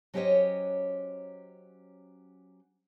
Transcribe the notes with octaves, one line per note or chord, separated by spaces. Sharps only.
F#3 C#4 G4 C5 C#5 D#5